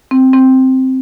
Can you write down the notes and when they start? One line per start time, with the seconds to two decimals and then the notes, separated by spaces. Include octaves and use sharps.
0.11 C4
0.33 C4